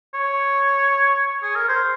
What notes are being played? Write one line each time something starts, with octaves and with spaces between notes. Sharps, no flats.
C#5
G#4
A#4
C5